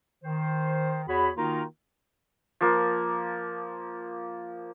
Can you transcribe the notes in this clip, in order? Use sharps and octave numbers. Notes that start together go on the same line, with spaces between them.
D#3 C5
E2 F#4 G#4 C#5 B5
D#3 A#3 D#4 F4 F#4 A#4
F3 A#3